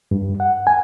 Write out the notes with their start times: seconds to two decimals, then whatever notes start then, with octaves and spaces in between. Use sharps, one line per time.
0.11 G2
0.40 F#5
0.67 G#5